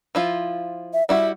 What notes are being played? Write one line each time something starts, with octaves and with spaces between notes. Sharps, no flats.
F3 E4 F4
E5
G3 E4 F#4 E5